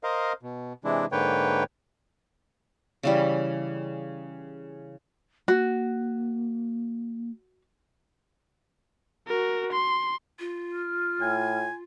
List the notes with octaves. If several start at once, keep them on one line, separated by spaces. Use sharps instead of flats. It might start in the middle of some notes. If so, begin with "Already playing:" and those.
A#4 C5 D#5 F5
B2
C3 E3 G#3 D4 E4
G#2 D3 A#3 B4 C#5 G5
C#3 E3 G3
A#3 F#4
F#4 A#4
C6
F4
F6
A2 G#5